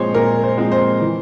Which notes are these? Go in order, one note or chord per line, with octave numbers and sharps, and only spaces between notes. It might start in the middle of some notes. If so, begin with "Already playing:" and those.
Already playing: A#2 F3 G#3 C4 C5 C#5
A#2 A#4
C5
F3 G#3 C4
C5
E3